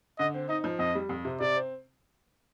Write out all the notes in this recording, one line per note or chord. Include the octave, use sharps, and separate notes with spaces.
D3 D#5
C4
D#4 D#5
F3
F2 D#5
G3
F2
C3
C3 D5
C4